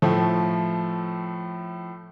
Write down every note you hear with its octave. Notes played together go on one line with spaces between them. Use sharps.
A2 F3 A3